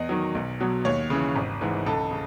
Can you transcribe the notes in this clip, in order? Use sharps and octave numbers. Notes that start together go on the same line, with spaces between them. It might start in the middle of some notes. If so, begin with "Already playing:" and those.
Already playing: E2 D#5
D#3 F#3
B1
B2 F#3
D#2 C#5
C#3 E3
G#1
G#2 E3
C#2 A4
C#3